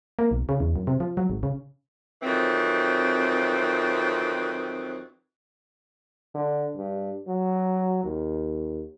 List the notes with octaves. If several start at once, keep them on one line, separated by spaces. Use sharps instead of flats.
A#3
B1
C#3
E2
F#2
C3
F3
F#3
G#1
C#3
F2 D#3 E3 F#3 C4
D3
G2
F#3
D#2